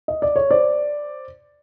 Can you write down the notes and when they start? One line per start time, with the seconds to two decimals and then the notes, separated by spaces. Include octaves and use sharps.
0.08 D#5
0.22 D5
0.36 C#5
0.51 C5 D5